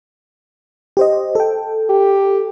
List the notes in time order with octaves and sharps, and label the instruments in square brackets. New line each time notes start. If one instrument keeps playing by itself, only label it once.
[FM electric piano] G4 C5 D#5
A4 G5
[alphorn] G4